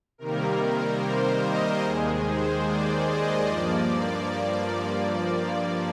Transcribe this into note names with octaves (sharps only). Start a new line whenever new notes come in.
C3 D#3 G3 A#3 A#4
A#4
C5
D#5
D#2 D#3 G#3 G#4
C5
D5
D#5
G2 F3 A#3 D5